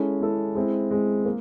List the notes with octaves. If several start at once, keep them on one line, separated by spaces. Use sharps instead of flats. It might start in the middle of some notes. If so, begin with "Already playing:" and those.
Already playing: G#3 C#4 E4 A4
G#3 C#4 E4 A4
G#3 C4 E4
G#3 C4 E4
A#3